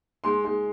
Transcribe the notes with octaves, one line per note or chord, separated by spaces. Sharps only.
G#3 C6
G#3